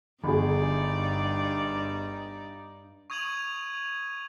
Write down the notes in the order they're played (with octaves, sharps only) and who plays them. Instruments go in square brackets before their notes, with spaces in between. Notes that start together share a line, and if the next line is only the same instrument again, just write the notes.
[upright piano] G1 G#4 [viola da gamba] G2 D#4 D5
[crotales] C#6 D#6 G#6 D#7 F7 F#7